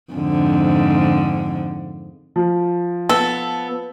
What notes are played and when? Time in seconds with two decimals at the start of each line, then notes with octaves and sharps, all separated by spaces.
0.13 F2 G#2 D3
2.36 F3
3.09 B3 A4